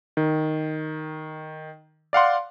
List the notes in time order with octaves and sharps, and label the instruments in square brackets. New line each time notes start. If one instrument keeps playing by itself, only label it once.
[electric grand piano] D#3
D5 F5 F#5 C6